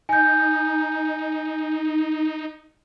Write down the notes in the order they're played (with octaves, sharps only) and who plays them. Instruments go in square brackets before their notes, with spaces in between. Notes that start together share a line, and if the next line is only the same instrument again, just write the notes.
[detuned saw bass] D#4 [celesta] G#5 G6